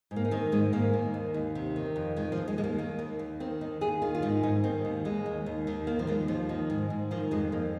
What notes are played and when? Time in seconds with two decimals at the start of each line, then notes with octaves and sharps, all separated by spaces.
0.11 G#2
0.16 A#3
0.25 D#4
0.31 D#3 C4
0.52 G#2 G#3
0.73 G#2 A#3
0.93 D#3
1.14 D#2
1.34 D#2
1.55 C3
1.76 D#3
1.96 F2
2.16 D#3 G#3
2.32 F3
2.38 D#2
2.48 G#3
2.58 D#2 G#3
2.64 A#3
2.78 D#3 A#3
2.99 D#2
3.19 D#2
3.40 D#3 C4
3.61 D#2 D#4
3.81 D#2 G#4
4.02 D#3 F4
4.15 F4
4.22 G#2 D#4
4.43 G#2 D#4
4.64 D#3 C4
4.85 D#2
5.05 D#2 G#3
5.26 D#3
5.46 D#2
5.67 D#2
5.87 D#3 A#3
5.99 F3
6.07 D#2 G#3
6.28 D#2 F3
6.49 D#3
6.70 G#2
6.90 G#2
7.11 D#3 F3
7.31 F2 G#3
7.52 F2 A#3